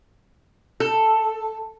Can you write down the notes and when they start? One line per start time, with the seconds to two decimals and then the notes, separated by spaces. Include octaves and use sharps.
0.80 A4